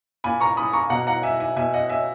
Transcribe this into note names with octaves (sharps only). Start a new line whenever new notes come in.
A#2 G#5 B5
A#5 C#6
B5 D#6
A#5 C#6
B2 F#5 A#5
F#5 A#5
E5 G#5
E5 G#5
B2 E5 G#5
D#5 F#5
E5 G#5